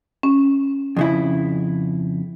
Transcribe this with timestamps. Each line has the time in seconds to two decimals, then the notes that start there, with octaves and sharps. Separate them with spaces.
0.23 C#4
0.97 F2 C#3 E4